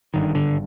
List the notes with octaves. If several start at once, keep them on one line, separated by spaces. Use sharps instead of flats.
G#1 G2 D3 D#3
D3